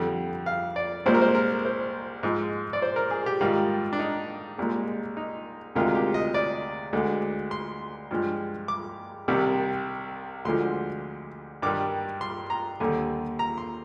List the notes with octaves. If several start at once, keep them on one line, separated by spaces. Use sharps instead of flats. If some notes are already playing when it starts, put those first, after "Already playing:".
Already playing: F2 D3 G3
F5
D5
C2 A#2 G#3 C5
A#4
C5
A#4
C5
G#2 F3 G#3
D5
C5
A#4
G#4
G4
G#2 D#3 G3 F4
D4
D#4
C2 A#2 G#3
D#4
D2 C3 D#3 G#3 F4
G4
D#5
D5
D2 D3 G#3
C6
G2 F3 G#3
D6
C2 C3 D#3 G3
D2 D3 F3 G#3 C6
G2 D#3 G3 D6
C6
A#5
D#2 D3 G3 G#5
A#5
C6